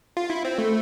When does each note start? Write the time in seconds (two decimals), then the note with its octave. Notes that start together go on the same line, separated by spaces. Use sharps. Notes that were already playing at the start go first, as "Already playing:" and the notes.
0.17 F4
0.30 E4
0.45 C4
0.58 A3